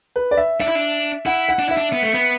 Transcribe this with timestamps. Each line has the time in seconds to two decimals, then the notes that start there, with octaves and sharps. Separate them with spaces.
0.16 B4
0.31 D5
0.37 E5
0.60 D4 E5
0.68 E4
0.75 D4
1.26 E4 F#5
1.49 F#5
1.59 D4
1.69 E4 E5
1.77 D4
1.92 B3
2.03 A3
2.14 B3